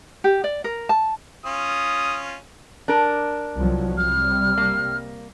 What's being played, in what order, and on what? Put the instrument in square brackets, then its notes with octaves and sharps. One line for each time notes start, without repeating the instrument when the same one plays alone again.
[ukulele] G4
D5
A#4
A5
[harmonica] C#4 F4 [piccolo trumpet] D#6
[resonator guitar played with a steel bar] D4 A#4
[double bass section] C2 F3 F#3
[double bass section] C3 G3 [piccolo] F6
[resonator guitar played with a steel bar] A#3